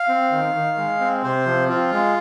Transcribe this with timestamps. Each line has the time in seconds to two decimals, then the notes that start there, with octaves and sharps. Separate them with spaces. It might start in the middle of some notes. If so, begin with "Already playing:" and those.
Already playing: F5
0.08 C4
0.31 D#3
0.55 D#3
0.77 G#3
1.00 C4
1.23 C3 C5
1.46 F3
1.68 C4 F4
1.92 G#3